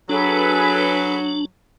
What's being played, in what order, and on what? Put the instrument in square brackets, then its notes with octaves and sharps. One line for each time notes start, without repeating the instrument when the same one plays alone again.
[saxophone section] F#3 [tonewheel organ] D4 [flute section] G#4 A4 B4